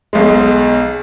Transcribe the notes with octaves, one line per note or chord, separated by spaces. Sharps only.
B1 B2 G#3